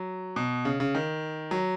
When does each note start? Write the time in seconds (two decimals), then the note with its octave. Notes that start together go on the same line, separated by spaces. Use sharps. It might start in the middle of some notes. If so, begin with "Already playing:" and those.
Already playing: F#3
0.36 B2
0.65 C#3
0.80 C#3
0.95 D#3
1.51 F#3